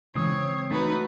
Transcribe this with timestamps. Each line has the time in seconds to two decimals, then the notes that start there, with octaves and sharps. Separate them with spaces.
0.15 C#3 E3 G#3 C4 C#5 D#6
0.71 A3 D#4 F#4 B4